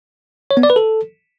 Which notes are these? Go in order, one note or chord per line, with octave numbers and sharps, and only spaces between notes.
C#5
B3
D5
B4
A4